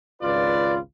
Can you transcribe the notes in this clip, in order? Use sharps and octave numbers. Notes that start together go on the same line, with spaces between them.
G#1 C#2 F4 B4 D5